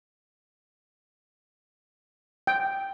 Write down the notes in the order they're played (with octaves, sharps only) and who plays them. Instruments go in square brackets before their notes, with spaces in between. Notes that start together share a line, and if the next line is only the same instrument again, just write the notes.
[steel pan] G5